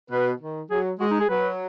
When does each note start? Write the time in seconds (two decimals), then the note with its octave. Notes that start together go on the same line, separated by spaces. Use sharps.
0.10 B2 B4
0.41 D#3
0.71 F#3 G#4
1.00 G#3 F#4
1.11 D#4
1.20 G#4
1.30 F#3 B4